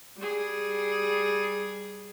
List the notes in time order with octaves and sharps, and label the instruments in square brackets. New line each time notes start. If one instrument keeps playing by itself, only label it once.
[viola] G3 G#4